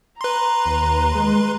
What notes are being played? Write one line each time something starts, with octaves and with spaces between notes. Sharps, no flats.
B4 A#5 C6
D#2
G#3